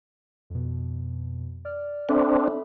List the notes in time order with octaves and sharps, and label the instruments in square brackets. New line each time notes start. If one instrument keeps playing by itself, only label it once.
[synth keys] F2 B2
D5 F6
[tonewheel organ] C4 D4 [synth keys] A4 E5 B5